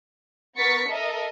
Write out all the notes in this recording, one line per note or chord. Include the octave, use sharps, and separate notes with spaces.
B3 A#4 C#6 A6 B6 C#7
A4 A#4 D#5 E5